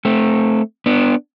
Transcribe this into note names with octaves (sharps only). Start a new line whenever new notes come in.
A3 C4
B3 D4